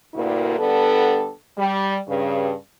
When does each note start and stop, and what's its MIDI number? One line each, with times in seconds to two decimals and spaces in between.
0.14 0.54 38
0.14 0.54 43
0.14 0.54 46
0.14 0.54 58
0.14 0.54 64
0.14 0.54 66
0.58 1.30 50
0.58 1.30 55
0.58 1.30 59
0.58 1.30 62
0.58 1.30 69
1.57 1.96 55
2.07 2.52 43
2.07 2.52 49